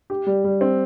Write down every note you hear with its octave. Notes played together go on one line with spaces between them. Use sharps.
G4
G3
G3
C4